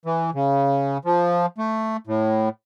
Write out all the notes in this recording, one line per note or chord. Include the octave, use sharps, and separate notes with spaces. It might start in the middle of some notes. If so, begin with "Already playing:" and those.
E3
C#3
F3
A3
A2